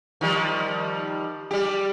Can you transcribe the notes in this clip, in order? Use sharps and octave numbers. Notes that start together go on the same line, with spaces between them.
D#3 F3 G3
G3 G4